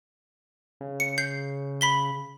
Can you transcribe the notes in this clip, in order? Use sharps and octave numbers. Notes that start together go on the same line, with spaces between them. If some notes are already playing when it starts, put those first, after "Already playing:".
C#3
C#7
G6 C7
B5 B6 G7